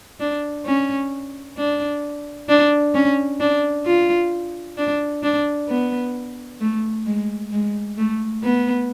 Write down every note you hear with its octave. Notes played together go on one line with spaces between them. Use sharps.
D4
C#4
D4
D4
C#4
D4
F4
D4
D4
B3
A3
G#3
G#3
A3
B3